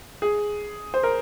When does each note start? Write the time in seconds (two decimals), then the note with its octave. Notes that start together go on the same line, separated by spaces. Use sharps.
0.22 G#4
0.94 C5
1.03 A#4